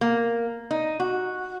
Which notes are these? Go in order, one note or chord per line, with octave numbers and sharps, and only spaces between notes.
A#3
D#4
F#4